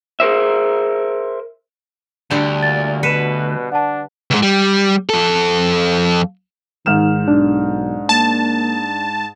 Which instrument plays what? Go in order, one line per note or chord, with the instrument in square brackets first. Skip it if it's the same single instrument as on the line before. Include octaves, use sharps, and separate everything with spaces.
[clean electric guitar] G#4 A#4 C5 E5
[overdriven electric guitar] D2 [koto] D3 G3
[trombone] A#2 [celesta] A6
[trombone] B2 [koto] B4 [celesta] C#7 D#7 E7
[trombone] D4 [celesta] F#5 A5
[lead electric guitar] C#2 G#2
G3
F2 A4
[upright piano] G#2 F6 E7 [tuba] D#3
[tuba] B1 [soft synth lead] D4
[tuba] A#3 [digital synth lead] A5